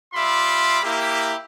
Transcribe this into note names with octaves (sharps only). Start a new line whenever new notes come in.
G3 F4 E5 B5 C6 D6
A#3 E4 G4